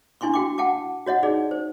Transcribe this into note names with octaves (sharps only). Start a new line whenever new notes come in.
D4 E4 G#5 C6 C#6
F#4 G5 D6
F#5 G5 A5 D6
F#4 C#5 D#5 F#5
D#4 G#4 D5
C5